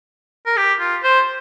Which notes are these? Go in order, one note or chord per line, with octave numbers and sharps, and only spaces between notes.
A#4
G4
F4
C5